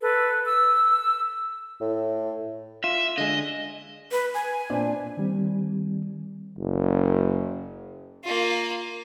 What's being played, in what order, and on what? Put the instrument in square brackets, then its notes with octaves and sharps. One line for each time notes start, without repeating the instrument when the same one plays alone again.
[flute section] A4 B4
E6
[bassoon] A2
[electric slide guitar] F4 [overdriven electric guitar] E5
[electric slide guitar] D3 G#3 [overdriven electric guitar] D#5
[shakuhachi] B4
G#5
[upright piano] A#2 C4 D4
[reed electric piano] D#3 G3 C4
[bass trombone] F#1
[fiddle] A#3 F4